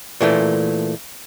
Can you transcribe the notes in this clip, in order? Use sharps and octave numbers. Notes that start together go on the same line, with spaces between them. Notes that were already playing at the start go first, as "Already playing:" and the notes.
A#2 E3 A3